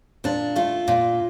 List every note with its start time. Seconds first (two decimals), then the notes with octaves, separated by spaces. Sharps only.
0.24 A#2 D4
0.56 A3 F4
0.88 A#2